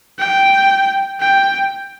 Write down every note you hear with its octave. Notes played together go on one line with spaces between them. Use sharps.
G5
G5